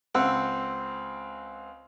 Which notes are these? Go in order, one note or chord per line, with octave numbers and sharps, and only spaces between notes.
C#2 C4 F#5 E6